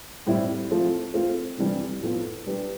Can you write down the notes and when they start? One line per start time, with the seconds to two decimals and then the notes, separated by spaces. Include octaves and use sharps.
0.27 A2 G3 C4 E4 G4
0.71 F3 A3 C4
1.14 A3 C4 F4
1.58 C3 E3 G3 D4
2.02 A2 F3 B3 F4 A4
2.46 G3 D4 G4 B4